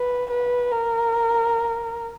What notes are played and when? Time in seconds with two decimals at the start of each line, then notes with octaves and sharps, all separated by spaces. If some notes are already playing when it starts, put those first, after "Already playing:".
Already playing: B4
0.31 B4
0.71 A#4